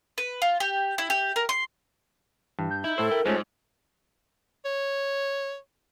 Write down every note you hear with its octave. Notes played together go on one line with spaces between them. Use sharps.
B4
F4
G4
E4
G4
A#4
C6
G2 E3
G6
D#4 E4
A2 A4 C5 E6
A#4 G5
G#2 G#3 A3 C#4 F4 C5
C#5